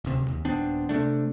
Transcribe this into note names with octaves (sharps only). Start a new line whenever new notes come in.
D1 C3
D#2
D#1 B3 C4 D4
C3 E3 A3 D4